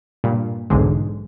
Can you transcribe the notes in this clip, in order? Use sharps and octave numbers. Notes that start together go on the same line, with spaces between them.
G2 A#2
B1 E2 G#2 D3 G#3